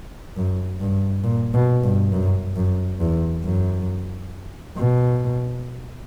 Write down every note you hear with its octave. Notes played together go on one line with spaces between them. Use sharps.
F#2
G2
A#2
B2
G2
F#2
F#2
E2
F#2
B2